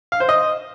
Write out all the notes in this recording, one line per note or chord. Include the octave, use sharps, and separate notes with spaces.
F5
C5
D#5